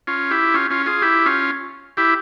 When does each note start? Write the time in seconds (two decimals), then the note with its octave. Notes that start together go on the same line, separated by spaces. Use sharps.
0.07 C#4 F4
0.31 E4 G4
0.54 C#4 F4
0.70 C#4 F4
0.86 F4 G#4
1.02 E4 G4
1.26 C#4 F4
1.97 E4 G4